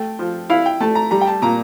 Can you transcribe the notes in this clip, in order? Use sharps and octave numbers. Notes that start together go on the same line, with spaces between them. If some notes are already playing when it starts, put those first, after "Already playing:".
Already playing: A3 G5
F3
E4 F5
G5
A3 A5
A#5
G3 A#5
G5
A5
A#2 A#5